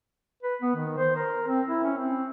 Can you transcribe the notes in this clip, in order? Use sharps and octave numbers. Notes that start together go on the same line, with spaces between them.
B4
B3
D#3
C5
A#4
C4
E4
C#4
C4